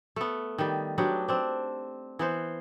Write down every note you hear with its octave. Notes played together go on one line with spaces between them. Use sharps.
A3 B3
D#3 G3
F#3 B3 D4 G4
C4 D4
E3 B3 C5